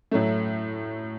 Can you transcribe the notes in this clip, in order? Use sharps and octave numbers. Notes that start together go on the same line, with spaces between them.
A2 F#3 A3